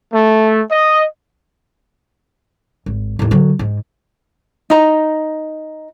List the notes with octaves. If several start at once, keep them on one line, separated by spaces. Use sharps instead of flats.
A3
D#5
G#1
D#2 A2
D3 F#3
G#2
D#4 A#5